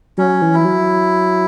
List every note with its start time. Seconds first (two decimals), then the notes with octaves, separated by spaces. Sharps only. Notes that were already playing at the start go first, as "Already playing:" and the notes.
0.18 F#3 C#4
0.42 E3
0.54 E4
0.65 F#3